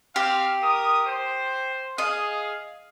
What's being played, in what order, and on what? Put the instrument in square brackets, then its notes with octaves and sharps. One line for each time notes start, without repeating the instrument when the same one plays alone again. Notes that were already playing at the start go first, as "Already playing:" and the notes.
[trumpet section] C4 F5 [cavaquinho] G4
[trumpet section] A#4 D#6
C5
[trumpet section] G#4 F5 [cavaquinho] D#5